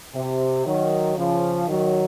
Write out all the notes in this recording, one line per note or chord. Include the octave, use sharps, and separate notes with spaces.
C3
D#3 F#3
C#3 F3
D#3 F#3